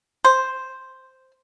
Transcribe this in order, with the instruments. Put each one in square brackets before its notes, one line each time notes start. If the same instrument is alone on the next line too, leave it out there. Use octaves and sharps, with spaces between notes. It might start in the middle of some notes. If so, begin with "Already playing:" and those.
[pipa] C5